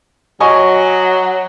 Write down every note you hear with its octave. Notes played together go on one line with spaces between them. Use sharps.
F#3 D#5 G#5 C#6